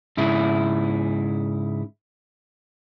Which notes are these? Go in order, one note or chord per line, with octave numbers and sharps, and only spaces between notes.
G#2 C#3 E4